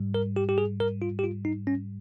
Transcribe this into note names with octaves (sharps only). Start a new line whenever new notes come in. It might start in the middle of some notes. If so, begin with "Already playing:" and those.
Already playing: G#2 G3
A#4
G4
G4
G#4
A#4
F4
G4
F4
D#4
C#4